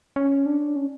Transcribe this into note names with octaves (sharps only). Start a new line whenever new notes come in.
C#4
D4
C#4